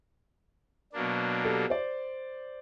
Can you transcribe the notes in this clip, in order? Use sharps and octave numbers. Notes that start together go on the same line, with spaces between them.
B2 F#3 A#3 D4
G4 A4
C5 D5